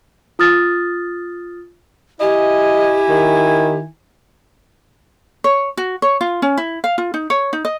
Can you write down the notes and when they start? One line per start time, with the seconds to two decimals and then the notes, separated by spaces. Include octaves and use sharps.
0.39 F4 D#6 F6 A6
2.20 E4 G4 D#5 G#5
3.09 D#3
5.44 C#5
5.77 F#4
6.02 C#5
6.21 F4
6.42 C#4
6.57 E4
6.84 F5
6.98 F4
7.14 D#4
7.30 C#5
7.53 D#4
7.65 D#5